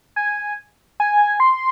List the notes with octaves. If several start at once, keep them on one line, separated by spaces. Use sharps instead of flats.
G#5
G#5
C6